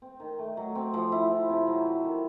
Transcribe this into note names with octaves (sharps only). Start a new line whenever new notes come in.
C4
D#3
A3
F#3
C4
F3
E4
F3
C3
F#3
F#3
D#3